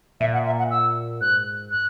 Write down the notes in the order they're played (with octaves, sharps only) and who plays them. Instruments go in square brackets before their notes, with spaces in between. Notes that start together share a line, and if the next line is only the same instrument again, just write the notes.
[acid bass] A#2 [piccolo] E5
[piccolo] F#5
E5
F#5
E6
[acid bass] G#2 [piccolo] F#6
[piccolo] F#6